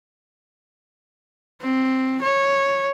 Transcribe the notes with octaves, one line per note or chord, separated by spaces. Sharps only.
C4
C#5